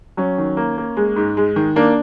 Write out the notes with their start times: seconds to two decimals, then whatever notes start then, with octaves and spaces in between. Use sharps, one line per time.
0.17 F#3 C#4
0.38 D#3
0.57 A#3
0.78 A#3
0.97 G#3
1.16 G#2
1.37 G#3
1.56 D#3
1.76 A#3 D4